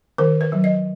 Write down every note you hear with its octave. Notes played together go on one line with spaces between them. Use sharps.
D#3 A#4
B4
F#3
D#5